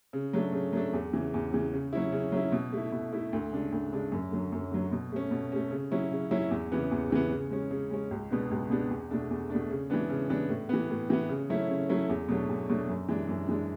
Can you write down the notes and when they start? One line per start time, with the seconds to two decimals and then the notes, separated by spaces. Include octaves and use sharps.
0.13 C#3
0.33 F#3 A3 D4
0.53 C#3
0.73 F#3 A3 D4
0.93 E2
1.13 C#3 E3
1.34 E2
1.52 C#3 E3
1.73 C#3
1.93 F#3 C#4 E4
2.12 C#3
2.32 F#3 C#4 E4
2.52 B2
2.73 A3 E4
2.92 B2
3.13 A3 E4
3.33 D2
3.52 C#3 G#3 D4
3.72 D2
3.93 C#3 G#3 D4
4.12 F#2
4.32 D3 F#3
4.52 F#2
4.72 D3 F#3
4.92 B2
5.12 A3 C#4
5.31 B2
5.52 A3 C#4
5.71 C#3
5.91 F#3 C#4 E4
6.12 C#3
6.31 F#3 C#4 E4
6.51 E2
6.72 C#3 E3 B3
6.91 E2
7.10 C#3 E3 B3
7.31 C#3
7.50 G#3 C#4
7.71 C#3
7.91 G#3 C#4
8.11 C#2
8.30 B2 G#3 B3 D4
8.51 C#2
8.70 B2 G#3 B3 D4
8.90 E2
9.11 B2 A3 D4
9.30 E2
9.50 B2 A3 D4
9.71 C#3
9.90 E3 G#3 B3 D4
10.10 C#3
10.29 E3 G#3 B3 D4
10.49 A2
10.69 E3 B3
10.90 A2
11.10 E3 B3
11.29 C#3
11.50 F#3 A3 C#4 E4
11.70 C#3
11.90 F#3 A3 C#4 E4
12.09 E2
12.28 B2 F#3 A3 D4
12.49 E2
12.69 B2 F#3 A3 D4
12.89 F#2
13.09 E3 G#3 D4
13.29 F#2
13.49 E3 G#3 D4